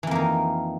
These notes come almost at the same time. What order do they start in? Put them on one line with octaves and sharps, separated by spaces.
E3 F2 A#3 D#3